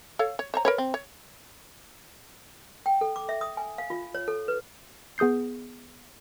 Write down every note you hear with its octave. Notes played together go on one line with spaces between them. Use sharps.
A4 C#5 F5
C#5
C5 C#5 A#5
A#4 B4 C#5
C4
C#5
G5
A4
D6
E5
D#6
G#5
F5
F4
C#5
A4
B4
B3 G#4 D#6 G6 C7